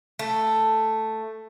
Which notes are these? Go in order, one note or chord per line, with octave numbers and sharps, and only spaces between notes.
A3